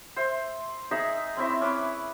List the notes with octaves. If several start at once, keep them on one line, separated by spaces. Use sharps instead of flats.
C5 E5 E6
D#4 G#4 E5 G#5
C4 C#4 E4 E5
C#4 B4 D6